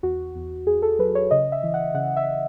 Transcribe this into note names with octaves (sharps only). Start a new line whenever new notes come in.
E2 F#4
E2
E2 G#4
A4
F#3 B4
C#5
C#3 D#5
E5
E3
F#5
C#3 F#5
E5